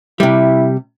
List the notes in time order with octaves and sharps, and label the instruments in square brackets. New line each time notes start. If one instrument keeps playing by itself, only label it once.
[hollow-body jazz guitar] C3 G3 [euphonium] E4